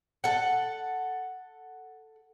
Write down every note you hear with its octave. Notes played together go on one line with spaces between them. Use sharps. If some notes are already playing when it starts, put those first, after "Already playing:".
A4 F#5